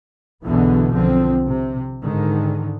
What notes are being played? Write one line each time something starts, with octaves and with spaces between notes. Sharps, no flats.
B1 E2 B2 D3 E3 B3
B1 D3 F3 C4
C3
G#2 D3 D#3